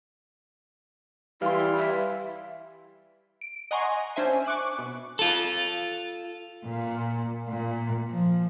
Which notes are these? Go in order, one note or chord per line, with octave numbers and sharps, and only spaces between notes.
E3 G3 E4 F5 C6
E5
D7
D#5 F#5 G#5 A#5 C6 C#6
C#4 D4 C5 E5 G#5
C#6 D6 F#6
B2
F4 A4
A#2
A#2
F3